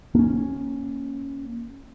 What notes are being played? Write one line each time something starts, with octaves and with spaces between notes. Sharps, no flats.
A#3 C#4